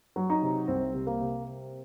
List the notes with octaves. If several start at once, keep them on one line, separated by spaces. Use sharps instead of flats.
F#3
D#4
C3
C2 C4
C3
A#3
C3